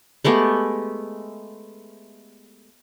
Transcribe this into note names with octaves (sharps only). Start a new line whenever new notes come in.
G#3 A3 B3 G4